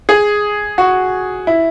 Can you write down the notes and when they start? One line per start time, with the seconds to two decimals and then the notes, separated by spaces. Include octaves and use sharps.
0.09 G#4
0.78 F#4
1.47 E4